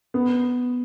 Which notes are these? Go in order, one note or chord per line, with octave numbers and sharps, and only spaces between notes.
B3